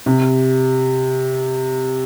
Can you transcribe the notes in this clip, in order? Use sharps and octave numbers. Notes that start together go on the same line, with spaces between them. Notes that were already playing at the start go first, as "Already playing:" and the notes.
C3